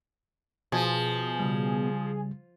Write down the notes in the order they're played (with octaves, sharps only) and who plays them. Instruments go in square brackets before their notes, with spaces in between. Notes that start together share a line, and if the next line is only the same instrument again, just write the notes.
[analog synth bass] B2 [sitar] F3 [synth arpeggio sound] G#4
[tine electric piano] C#3 G3